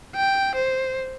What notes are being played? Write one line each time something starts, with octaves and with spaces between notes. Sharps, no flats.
G5
C5